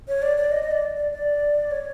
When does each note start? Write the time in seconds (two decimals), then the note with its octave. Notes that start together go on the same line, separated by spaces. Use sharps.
0.08 C#5
0.22 D5
0.37 D5
0.52 D#5
0.62 D#5
0.71 D5
0.96 D5
1.12 D5
1.71 C#5